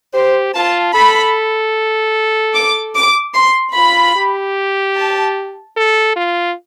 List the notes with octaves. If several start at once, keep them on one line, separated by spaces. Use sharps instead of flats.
G4 C5
F4 A5
A4 B5
D6
D6
C6
F4 B5
G4
A5
A4
F4